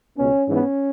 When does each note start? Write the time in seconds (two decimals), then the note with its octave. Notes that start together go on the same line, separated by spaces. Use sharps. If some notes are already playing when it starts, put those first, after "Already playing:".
0.18 C#2 B2 B3 C#4
0.48 G#2 E3 B3 C#4